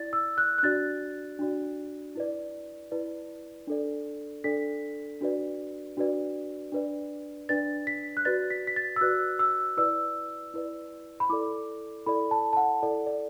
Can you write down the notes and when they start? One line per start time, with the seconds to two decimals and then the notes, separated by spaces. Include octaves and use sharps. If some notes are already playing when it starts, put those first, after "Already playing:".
Already playing: E4 D5 A6
0.13 E6
0.38 F#6
0.58 F#6
0.63 D4 F#4 D5 A6
1.39 D4 F#4 D5
2.15 E4 B4 D5
2.92 E4 B4 D5
3.67 D4 A4 D5
4.44 D4 A4 D5 B6
5.21 D4 F#4 B4 D5
5.97 D4 F#4 B4 D5
6.72 D4 B4 D5
7.49 D4 B4 D5 A6
7.87 B6
8.17 F#6
8.25 F#4 B4 D5 A6
8.50 B6
8.67 B6
8.76 A6
8.96 E6
9.01 F#4 B4 D5 F#6
9.39 E6
9.77 E4 B4 D5 E6
10.54 E4 B4 D5
11.20 B5
11.30 E4 A4 D5 D6
12.06 E4 A4 D5 B5
12.31 A5
12.53 A5
12.57 F#5
12.83 E4 A4 D5
13.07 D5